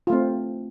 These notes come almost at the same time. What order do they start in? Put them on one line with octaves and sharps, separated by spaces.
F4 A3 C4